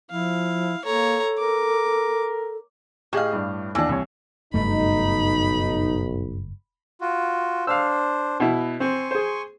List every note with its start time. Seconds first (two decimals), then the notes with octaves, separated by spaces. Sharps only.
0.11 F3 E4 F5
0.85 A#3 A4 C#5 A#5
1.38 A#4 D6
3.13 A2 G4 G#4 D#5 F5
3.33 G2 D4
3.75 D#2 E3 D4
3.89 C2 C#5
4.54 F#1 B1 G2 A3 D#4 B5
7.01 F4 F#4
7.67 D4 C5 F5 E6
8.40 B2 E4
8.80 C4 G#5 C6 C#6
9.11 G#4 C5